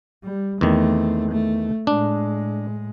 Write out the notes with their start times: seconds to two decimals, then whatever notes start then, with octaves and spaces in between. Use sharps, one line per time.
0.24 G3
0.61 E2 D#3 A3 C4
1.32 A3
1.87 A2 G#3 D4